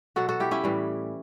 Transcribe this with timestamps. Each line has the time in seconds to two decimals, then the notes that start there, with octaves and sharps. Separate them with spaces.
0.16 B2 F#3 F#4 A4
0.29 F#4 A4
0.40 E4 G4
0.51 C#4 E4
0.64 A2 E3 G3